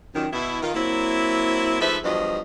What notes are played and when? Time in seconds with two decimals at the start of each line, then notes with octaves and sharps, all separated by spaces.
0.14 F#2 A#2 D#3
0.32 B2 E4
0.62 D#3 F4
0.74 F#3 A#3 C4 E4
1.81 G#2 F3 A3 B4 C5 E5
2.04 E2 G2 F3 F#3 D#5